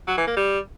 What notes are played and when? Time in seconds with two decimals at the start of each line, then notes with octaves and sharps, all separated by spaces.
0.08 F#3
0.17 E3
0.27 A#3
0.37 G3